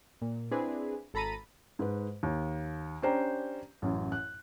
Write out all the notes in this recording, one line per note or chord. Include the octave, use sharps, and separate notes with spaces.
A#2
C4 D4 E4 G#4 B4
G#1 A4 A#5 B5 A6 D#7
G#2 B4
D#2
C#4 D4 G4 C5 G5 A#5
A1 F#2
F#6